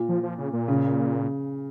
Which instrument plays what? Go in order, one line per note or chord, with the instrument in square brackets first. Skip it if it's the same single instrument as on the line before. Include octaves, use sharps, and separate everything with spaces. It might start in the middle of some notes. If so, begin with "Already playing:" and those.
Already playing: [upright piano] A#2
[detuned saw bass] F3
F3
C#3
A#2
[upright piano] C#3